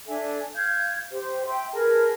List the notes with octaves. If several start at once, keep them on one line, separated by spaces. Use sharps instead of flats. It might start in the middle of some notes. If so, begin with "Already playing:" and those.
D4 A4 E5 G#5
F5 G6 G#6
G4 C5
E5 G5 C6
G#4 A#4 B4 A5